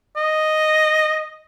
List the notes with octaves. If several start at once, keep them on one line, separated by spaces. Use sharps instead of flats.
D#5